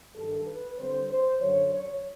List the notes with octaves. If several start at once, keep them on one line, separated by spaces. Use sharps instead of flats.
G2 D#3 G3 A4
B4
D3 G3 C4 C5
C5
F#2 D3 F#3 C#5
C#5